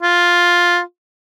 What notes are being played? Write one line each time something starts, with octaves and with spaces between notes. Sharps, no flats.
F4